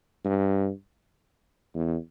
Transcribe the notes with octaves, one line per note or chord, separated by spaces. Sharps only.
G2
E2